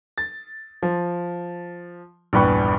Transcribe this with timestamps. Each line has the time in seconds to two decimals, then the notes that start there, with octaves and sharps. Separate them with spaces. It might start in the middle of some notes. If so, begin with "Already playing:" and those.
0.18 A6
0.83 F3
2.33 A#1 E2 G2 B4 G5 C#6